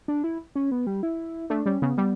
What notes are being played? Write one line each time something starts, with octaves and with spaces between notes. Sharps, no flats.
D4
E4
C#4
B3
G3
E4
A3 D4
G3 C#4
C#3 B3
G3